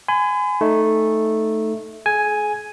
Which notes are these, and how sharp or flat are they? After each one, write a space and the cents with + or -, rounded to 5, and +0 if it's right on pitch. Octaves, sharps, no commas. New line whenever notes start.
G#5 +0 B5 +45
A3 +0 D#4 +0
G#4 +35 G#5 +0